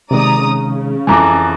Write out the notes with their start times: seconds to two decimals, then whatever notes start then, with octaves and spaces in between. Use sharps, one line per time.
0.11 C3 D#3 G#3 D5 A#5 D#6
0.44 C#3
1.07 F2 E3 G#5 A#5 D6